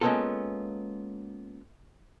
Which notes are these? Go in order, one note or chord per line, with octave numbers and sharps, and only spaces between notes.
G#3 A#3 B3 C#4 F4 A4